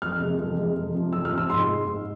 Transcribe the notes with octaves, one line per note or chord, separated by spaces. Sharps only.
F2 F6
C3 G#3
F2
C3 G#3
F2
C3 F3
F2 E6
F6
C3 F3
E6
G#2 C6
G#3
G#2